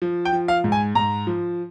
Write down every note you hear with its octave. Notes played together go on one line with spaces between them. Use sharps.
F3
G5
F3
F5
G#2
G#5
G#2 A#5
F3